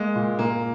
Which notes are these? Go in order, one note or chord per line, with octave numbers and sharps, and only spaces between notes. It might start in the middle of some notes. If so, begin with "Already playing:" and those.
Already playing: G#3 A#3
A#2
A#2 A#3